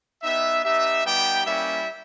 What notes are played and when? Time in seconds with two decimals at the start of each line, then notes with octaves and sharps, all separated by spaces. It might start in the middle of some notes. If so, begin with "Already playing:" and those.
0.23 B3 D#4 G4 E5
0.64 B3 D#4 G4 E5
1.05 G3 B3 D#4 G4 G5
1.45 G3 A#3 C#4 E4 E5